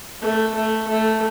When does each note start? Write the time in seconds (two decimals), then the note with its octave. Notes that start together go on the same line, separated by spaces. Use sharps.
0.22 A3
0.54 A3
0.88 A3